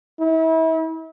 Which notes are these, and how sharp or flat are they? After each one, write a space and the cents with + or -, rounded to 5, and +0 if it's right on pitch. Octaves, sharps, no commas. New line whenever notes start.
E4 -35